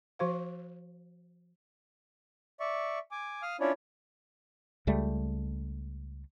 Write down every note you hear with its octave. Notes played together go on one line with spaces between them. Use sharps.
F3 F#4 C5 F5
D5 E5 C#6
G#5 D6
F5 D#6 F6
C#4 D4 E4 F4 C#5 D5
C#2 C#3 G3 A3